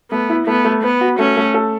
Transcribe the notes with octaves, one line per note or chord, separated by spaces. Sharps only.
A3 B3
E4
A3 B3
A3
B3 B4
F#4
A3 C#4
A3
A4